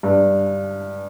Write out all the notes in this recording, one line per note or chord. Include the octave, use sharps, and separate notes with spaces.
G2